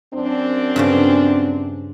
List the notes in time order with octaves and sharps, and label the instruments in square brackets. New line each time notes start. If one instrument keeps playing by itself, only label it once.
[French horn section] F#2 C4 D4
[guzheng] G2 C#3 C#4